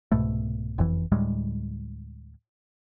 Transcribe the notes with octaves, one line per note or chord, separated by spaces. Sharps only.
C2 G#2 B2 A3
F#1 F2 E3
D2 A2 G3 G#3